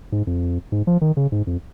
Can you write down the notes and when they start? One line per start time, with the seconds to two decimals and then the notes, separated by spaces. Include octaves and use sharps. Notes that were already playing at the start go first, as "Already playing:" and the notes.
0.12 G#2
0.27 F2
0.72 G#2
0.87 F3
1.01 D#3
1.17 C#3
1.32 G#2
1.47 F2